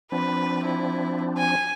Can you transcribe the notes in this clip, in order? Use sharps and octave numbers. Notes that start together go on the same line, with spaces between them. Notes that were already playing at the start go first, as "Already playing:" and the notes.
F3 C4 D4 B4
E4
G#5